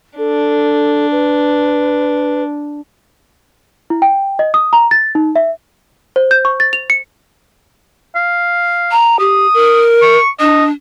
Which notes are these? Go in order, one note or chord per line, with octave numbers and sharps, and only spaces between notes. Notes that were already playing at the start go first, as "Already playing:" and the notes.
D4 A4
B4
E4
G5
D#5
D#6
A#5
A6
D#4
E5
C5
G6
C#6
A6
F7
C#7
F5
A#5
G4 D#6
A#4
C#6
D4 D#5